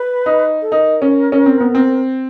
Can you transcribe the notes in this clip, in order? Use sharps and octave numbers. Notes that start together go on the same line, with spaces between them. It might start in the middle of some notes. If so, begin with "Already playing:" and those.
Already playing: B4
D#4
A4
D#4 A#4
C#4
C#4
C4
B3
C4